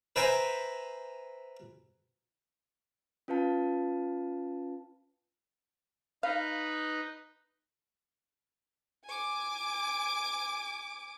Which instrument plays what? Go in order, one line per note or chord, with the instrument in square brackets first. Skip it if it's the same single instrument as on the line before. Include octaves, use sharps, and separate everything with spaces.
[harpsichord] B4 C5 E5 G5 G#5 A#5
[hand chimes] C#4 F4 B4 F5 A5
[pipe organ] D#4 B4 [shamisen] F5
[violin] G#5 D6